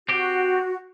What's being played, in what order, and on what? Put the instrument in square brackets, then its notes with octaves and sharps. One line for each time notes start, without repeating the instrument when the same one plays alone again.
[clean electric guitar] C4 G4 [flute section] F#4